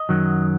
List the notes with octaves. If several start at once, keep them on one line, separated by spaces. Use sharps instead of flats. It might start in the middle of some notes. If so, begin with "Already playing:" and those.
Already playing: D#5
F#2 D#3 F#3